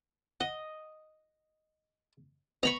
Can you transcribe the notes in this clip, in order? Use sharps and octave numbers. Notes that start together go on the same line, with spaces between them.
D#5 F#5
B3 D#5 A#5 B5 C#6